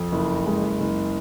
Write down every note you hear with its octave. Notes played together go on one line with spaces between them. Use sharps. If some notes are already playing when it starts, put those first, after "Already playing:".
Already playing: F2
F#1
G#3
F#1